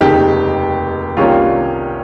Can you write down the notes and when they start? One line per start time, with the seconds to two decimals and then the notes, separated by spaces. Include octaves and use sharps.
0.01 F1 D#2 C#3 D#4 G4
1.17 C2 C3 D#3 G3 A#3 C#4 F4